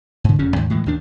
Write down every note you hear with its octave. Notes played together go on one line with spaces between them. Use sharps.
G#2 D3
F1 F2 C#3 C#4
D#2 G#2
A2 E3 G#3
D#2 D#3 D4